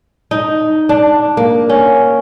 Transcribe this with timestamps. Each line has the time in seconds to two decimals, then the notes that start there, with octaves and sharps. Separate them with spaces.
0.31 D#4
0.89 D4
1.37 A#3
1.69 C#4